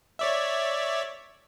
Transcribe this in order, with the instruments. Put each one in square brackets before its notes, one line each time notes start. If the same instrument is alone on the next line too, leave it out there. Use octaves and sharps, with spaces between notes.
[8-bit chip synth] C#5 D5 E5